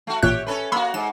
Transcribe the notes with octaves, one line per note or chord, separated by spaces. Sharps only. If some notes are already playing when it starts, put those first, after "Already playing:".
A3 F#4
A1 A#2 G4 C#5 E5 F#6
C#4 A4 B4
A#3 F#4 B5 C6 E6
G#2 E7